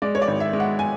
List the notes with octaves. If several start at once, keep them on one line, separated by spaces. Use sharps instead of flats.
G#3 D5
C#5
D5
G#1
E5
G#3
F#5
G#5